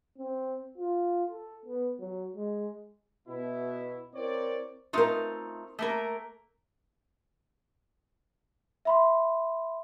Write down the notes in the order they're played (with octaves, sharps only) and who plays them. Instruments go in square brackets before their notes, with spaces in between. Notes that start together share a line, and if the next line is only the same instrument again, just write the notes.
[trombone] C4
F4
A4
B3
F#3
G#3
[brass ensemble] B2 E4
C4 E4 A#4 C#5 D5
[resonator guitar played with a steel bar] A3 D#4 F4 [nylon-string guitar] C4 A#4
[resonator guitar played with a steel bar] A3 A#3 A#4
[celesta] E5 B5 C6